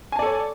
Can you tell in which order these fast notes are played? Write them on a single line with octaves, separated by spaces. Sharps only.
G#5 A5 D5 A4 C#5